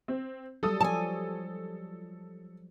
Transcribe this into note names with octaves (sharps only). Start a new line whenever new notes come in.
C4
F#3 G3 A4 D#6
F3 C#5 G#5 A5